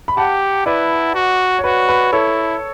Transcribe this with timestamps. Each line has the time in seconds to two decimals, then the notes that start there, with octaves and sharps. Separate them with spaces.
0.08 B5
0.17 G4 F#5 A5
0.66 E4 B4 D5
1.15 F#4
1.59 C#5
1.64 F#4 B4
1.89 B4
2.13 E4 A4 C#5